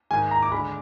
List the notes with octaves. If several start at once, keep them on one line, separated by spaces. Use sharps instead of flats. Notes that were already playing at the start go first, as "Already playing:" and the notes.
G#2 D#3 G#3 G#5
A#5
D6
D3 G#3 B5